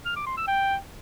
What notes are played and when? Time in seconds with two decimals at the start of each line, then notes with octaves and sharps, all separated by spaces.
0.05 F6
0.16 D6
0.27 C6
0.37 E6
0.48 G5